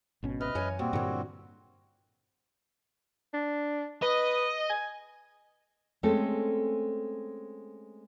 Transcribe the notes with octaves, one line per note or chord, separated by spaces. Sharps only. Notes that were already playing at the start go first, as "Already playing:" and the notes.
G#1 B2 C#4
C3 B4 D#5 F6
F#2 E3 C#5 G#5
A#2 G3 C4 F#4
G2 A#2 D3 E3 F#3
D4
B4 D#5
G#5
G#3 A3 C4 C#4 A4